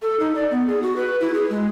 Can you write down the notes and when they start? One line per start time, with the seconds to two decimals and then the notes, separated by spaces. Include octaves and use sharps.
0.02 A4
0.20 D#4
0.35 D5
0.51 B3
0.67 G#4
0.82 F#4
0.96 B4
1.20 E4
1.34 G#4
1.50 G#3